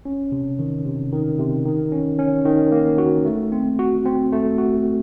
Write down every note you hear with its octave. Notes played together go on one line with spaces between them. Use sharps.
C#4
C3
D#3
C3
D#3
C3
D#3
C#4
C#4
D#3
A#3
F#4
A3
C4
F#4
C4
A3
F#4